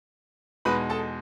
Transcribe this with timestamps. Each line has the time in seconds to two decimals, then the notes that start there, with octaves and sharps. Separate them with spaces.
0.65 E2 B2 G#3 D#4 B4 B5
0.90 A4 A5